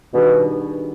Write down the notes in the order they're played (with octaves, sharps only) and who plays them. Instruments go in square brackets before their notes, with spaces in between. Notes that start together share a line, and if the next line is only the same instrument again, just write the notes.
[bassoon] B2 [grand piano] D#3 G3 D4 G#4